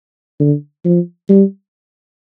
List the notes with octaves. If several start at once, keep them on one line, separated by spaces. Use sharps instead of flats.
D3
F3
G3